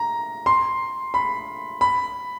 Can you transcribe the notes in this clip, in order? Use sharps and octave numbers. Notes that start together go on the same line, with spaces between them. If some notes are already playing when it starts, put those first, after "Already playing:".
Already playing: A#5
C6
B5
B5